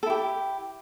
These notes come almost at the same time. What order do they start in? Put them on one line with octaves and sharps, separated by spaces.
A4 E4 G4